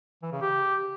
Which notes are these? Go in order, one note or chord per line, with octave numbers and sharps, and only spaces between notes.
E3
C#3
G4